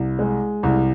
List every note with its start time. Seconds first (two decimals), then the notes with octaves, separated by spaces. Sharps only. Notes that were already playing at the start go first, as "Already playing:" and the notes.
Already playing: C2
0.19 G#3
0.63 C2